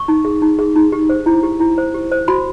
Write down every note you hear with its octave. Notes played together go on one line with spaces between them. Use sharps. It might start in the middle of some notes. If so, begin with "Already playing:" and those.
Already playing: C#6
D#4
G#4
D#4
G#4
D#4
G4
C5
E4
G4
E4
C5
G4
C5
F#4 B5